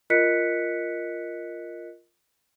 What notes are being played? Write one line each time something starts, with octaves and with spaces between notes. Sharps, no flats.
F4 A#4 D#5 F#6 B6 C#7